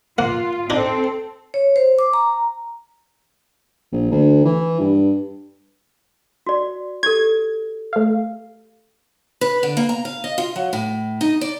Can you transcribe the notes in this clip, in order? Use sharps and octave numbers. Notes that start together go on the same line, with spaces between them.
A#3 F4 F#5
C4 D4 D#4 A4
C#5
C5
D6
A#5
A#1
D2
E3
G2
F#4 D5
G4 A4 G#6
A3 F5
B4
D3
A#3
A#5
F5
D#5
F4
F#3
A2
D#4
D5